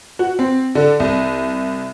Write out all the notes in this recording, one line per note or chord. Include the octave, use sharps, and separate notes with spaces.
F#4
C4
D3
C2